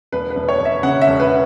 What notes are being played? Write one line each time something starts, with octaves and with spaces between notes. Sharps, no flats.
E1 B4
B4
E1
C#5
E1
E5
C#3 F#5
E5
E1
B4